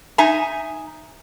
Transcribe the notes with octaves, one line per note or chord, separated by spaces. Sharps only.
D#4 E5 G#5 A#5